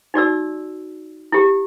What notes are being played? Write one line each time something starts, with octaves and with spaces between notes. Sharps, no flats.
D#4 F#4 D5 E6
E4 G4